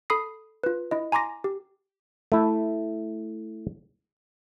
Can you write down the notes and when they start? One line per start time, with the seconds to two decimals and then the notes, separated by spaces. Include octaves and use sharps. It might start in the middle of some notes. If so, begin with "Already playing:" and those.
0.10 A4 B5 D#6 C7
0.64 F4 B4
0.91 E4 D#5
1.12 G#5 A#5 C6 D6 A#6
1.44 G4
2.32 A3 E4